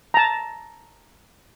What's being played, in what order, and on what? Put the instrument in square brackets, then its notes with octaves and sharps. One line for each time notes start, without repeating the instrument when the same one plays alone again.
[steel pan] A5 A#5